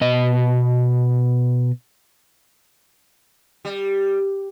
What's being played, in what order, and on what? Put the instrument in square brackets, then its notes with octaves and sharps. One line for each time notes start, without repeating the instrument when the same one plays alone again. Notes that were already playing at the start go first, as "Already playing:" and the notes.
[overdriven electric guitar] B2 D#5
[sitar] G3